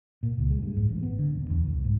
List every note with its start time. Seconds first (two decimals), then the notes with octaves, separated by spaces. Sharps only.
0.23 A#2
0.38 C#2
0.50 G#3
0.63 G2
0.77 G#2
0.89 A1
1.03 B3
1.19 D3
1.35 D#1
1.50 E2
1.67 C2
1.84 G#2